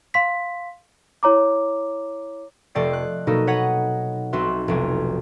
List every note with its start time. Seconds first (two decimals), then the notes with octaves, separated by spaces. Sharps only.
0.14 F5 C6 B6
1.23 E4 C#5 A#5 D6
2.75 F1 A3 D5 D#5 G5 C7
2.93 F#6
3.27 B2 F#3 A#3 D#4 A4
3.47 B4 C#5 D#5 F#5
4.33 B1 C4 F#4 B4 E5 C6
4.68 F1 B1 G#5